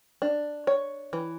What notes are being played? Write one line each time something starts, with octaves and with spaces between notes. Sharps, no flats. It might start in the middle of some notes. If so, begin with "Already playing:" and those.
D4
C#5
E3